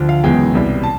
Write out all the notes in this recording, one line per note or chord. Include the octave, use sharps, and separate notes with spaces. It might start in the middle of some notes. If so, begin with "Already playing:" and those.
Already playing: D2 F3
F5
F#1 E2 B2 G#3 G5
C2 B2 G3
A5